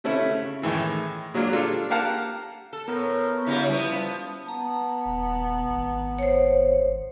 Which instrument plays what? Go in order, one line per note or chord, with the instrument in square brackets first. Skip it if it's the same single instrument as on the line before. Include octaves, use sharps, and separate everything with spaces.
[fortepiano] C3 A3 C#4 E4
C#3
A2 D#3 E3 G#3
A#2 F#3 G#3 A#3 D4 F4
G3 D4 F4 A4
A#3 G4 A#4 F5 F#5 A5
[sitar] A4
[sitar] A2 [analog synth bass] B3 [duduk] A#4
[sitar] C#3 F#3 G3 [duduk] E4
[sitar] F3 B3 [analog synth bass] G3
[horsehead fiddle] B3 [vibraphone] A5 A#5
[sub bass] D#1
G#1
[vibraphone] C5 C#5
[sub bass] G#1